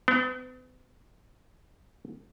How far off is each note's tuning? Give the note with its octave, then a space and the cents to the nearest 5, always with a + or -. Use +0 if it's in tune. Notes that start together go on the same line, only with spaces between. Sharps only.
B3 +45